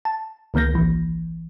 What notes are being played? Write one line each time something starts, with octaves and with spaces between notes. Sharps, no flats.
A5
C#2 D#3 A#3 G6 A#6
A1 E3